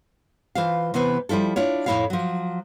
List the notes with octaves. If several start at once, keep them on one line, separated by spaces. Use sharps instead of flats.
E3 F4 C5 F5
C3 E3 B3 B4 C5
F3 G3 E4 F4 A4
D4 E4 F4 C#5
F2 A2 A#3 E4 C#5 F5
F3 F#3